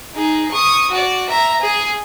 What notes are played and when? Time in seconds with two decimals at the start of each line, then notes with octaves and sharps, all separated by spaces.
0.15 D#4 G#4
0.51 C#6 D#6
0.91 F#4 D5
1.29 E5 A#5
1.61 G#4 G#5